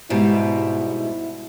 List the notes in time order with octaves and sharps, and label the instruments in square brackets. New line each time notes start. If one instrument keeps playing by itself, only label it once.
[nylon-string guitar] G#2 B2 G3 [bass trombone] E4